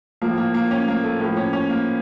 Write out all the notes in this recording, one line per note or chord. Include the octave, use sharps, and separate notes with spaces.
A2 F3 A#3
A#3
A#3
C#4
A#3
A3
A2 F3 A#3
C#4
C#4
A#3